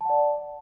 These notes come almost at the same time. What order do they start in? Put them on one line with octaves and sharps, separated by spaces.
A5 F#5 D5